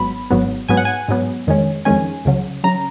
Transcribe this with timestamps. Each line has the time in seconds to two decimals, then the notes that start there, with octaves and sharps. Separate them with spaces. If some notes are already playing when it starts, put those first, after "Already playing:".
Already playing: G#1 G#2 F#3 B3 B5
0.31 G#1 G#2 F#3 B3
0.69 G#2 F#3 B3 G#5
0.77 F#5
0.85 G#5
1.08 G#2 F#3 B3
1.47 F2 D#3 G#3 C#4
1.85 F2 D#3 G#3 C#4 G#5
2.25 C#2 C#3 F#3
2.64 C#3 F#3 A#5